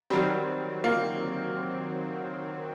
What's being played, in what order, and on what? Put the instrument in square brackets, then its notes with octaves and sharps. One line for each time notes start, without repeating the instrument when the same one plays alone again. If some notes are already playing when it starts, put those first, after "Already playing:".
[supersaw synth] D#3 F#3 C4 [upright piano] G3
[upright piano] A#3